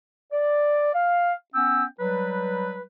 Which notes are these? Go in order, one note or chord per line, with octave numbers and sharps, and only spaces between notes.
D5
F5
B3 C#4 G5 E6
F#3 G3 B4